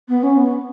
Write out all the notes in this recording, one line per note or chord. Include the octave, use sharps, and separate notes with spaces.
B3
C#4
B3